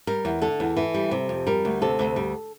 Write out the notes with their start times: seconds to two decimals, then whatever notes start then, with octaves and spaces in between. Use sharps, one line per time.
0.07 G3 A#4
0.25 E2
0.42 D3 A4
0.60 E2
0.77 E3
0.94 G3
1.11 C3
1.29 F2
1.47 G3 A#4
1.65 D2
1.82 C3 A4
1.99 D2
2.16 G3